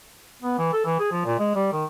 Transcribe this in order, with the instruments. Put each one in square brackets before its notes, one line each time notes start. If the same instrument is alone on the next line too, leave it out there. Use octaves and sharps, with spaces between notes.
[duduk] B3
E3
A4
E3
G#4
F3
A#2
G#3
G3
D#3